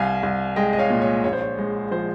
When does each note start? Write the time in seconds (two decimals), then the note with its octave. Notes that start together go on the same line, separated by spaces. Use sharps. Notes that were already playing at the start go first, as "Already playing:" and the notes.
Already playing: C2 F5 G#5
0.23 C2
0.56 G#3 D#5 G5
0.73 D#5
0.79 C#5 F5
0.90 A#2
1.02 C#5
1.24 A#1 C#5
1.33 C5
1.41 C#5
1.58 G#3
1.91 F3 C5